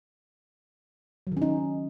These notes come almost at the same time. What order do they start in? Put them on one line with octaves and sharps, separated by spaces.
F#3 D#3 C#4 D#4